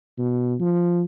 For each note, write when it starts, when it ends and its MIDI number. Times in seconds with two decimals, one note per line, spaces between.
0.18 0.55 47
0.60 1.03 53